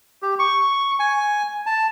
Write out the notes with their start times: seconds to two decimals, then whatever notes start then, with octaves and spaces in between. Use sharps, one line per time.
0.22 G4
0.39 C#6
0.99 G#5
1.66 A5